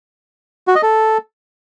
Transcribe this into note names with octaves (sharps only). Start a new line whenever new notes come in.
F#4
D#5
A4